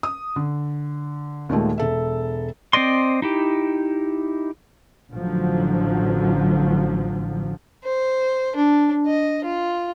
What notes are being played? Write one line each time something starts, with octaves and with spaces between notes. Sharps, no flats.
D#6
D3
D#2 A#2 D#3 G#3 A3
E1 A4 E5
C4 C5 D5 D#5 C6
D#4 E4 G4
A1 D3 F3 F#3
C5
D4
D#5
F4